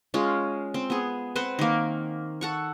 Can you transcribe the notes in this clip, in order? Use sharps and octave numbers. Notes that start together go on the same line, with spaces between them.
G#3 C#4 F4
C4
B3 G#4
C4 B4 C5 F#5
D#3 A#3
A4 F#5 C#6